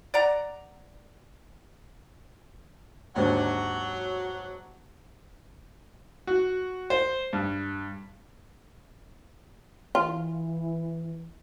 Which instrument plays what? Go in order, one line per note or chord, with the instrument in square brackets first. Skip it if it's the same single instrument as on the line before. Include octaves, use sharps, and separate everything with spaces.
[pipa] D5 F#5 A#5
[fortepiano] D#2 G#2 D3 [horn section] F#3
[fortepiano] F#4
C5
G2
[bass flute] E3 [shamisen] F4